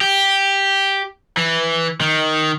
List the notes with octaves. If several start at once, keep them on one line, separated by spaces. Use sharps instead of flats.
G4
E3
D#3